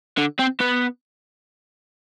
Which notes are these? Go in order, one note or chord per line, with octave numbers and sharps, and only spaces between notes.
D3
C4
B3